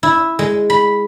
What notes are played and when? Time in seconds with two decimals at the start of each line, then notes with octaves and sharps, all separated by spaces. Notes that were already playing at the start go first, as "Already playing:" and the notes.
0.03 E4
0.39 G#3
0.70 B5